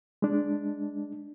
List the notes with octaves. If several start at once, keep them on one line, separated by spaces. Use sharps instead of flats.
G#3 D4